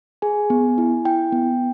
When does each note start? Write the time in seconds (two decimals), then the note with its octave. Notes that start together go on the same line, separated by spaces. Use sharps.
0.22 G#4 G#5
0.50 B3
0.78 E4
1.05 E4 G5
1.32 B3